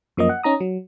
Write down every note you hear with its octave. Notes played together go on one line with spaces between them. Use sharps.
F#2 F3 A#3 D#5
F#5
C#4 D#4 A#5 D#6
F#3